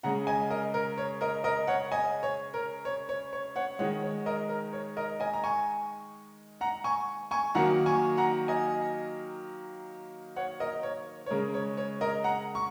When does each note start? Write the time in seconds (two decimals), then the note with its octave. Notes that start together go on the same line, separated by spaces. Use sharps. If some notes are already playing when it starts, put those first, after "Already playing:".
0.03 C#3 G#3 F#5 A#5
0.27 D#5 G#5
0.50 A#4 D#5
0.74 A#4
0.98 C#5
1.21 A#4 D#5
1.44 A#4 D#5
1.67 C#5 F#5
1.92 D#5 G#5
2.23 C#5
2.54 A#4
2.85 C#5
3.09 C#5
3.33 C#5
3.56 C#5 F#5
3.79 D#3 G#3 C#5 F#5
4.03 C#5
4.26 A#4 D#5
4.49 A#4
4.73 C#5
4.97 A#4 D#5
5.20 D#5 G#5
5.33 A#5
5.44 G#5 C#6
6.61 F#5 A#5
6.84 G#5 C#6
7.31 G#5 C#6
7.55 D#3 F#3 A#3 F#5 A#5
7.86 G#5 C#6
8.17 F#5 A#5
8.48 D#5 G#5
10.36 C#5 F#5
10.60 A#4 D#5
10.83 C#5
11.26 C#5
11.30 C#3 G#3 A#4
11.54 C#5
11.77 C#5
12.01 A#4 D#5
12.24 F#5 A#5
12.55 C#6